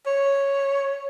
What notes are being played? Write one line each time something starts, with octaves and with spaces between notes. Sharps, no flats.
C#5